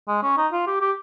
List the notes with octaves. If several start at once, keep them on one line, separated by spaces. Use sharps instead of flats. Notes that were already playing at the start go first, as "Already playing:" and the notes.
G#3
C#4
D#4
F4
G4
G4